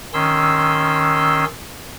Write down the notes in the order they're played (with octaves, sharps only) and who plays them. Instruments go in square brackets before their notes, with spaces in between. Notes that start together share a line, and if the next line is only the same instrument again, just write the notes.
[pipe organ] D#3 C#4 C6 E6